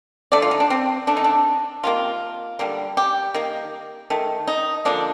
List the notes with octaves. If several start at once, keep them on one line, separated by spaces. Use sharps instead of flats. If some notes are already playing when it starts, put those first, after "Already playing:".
D3 A3 D5
F4
D#4
D4
C4
D3 A3 D4
D#4
D4
C3 D#3 A#3 F4
D3 G3 A#3
G4
D#3 A#3
D#3 A3
D#4
D3 F3 A#3 D4